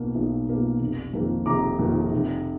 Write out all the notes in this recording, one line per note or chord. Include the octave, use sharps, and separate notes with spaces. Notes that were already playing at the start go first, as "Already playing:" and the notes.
Already playing: B1 B2 A#3
B1
B2 A#3
F1
F2 D#3 A#3
F1 A#5 D6
F2 D#3 A#3
F1